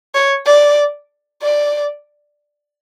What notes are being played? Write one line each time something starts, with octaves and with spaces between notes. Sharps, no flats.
C#5
D5
D5